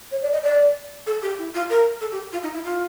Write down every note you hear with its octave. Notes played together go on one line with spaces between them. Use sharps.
C#5
D5
D#5
D5
A4
G4
E4
F4
A#4
A4
G4
F4
D#4
E4
F4